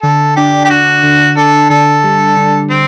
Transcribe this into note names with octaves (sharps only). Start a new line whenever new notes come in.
D3 A4
D4 G4
G4
D4 F#4
D3
D4 A4
D3 A4
G3
D3
D3 C4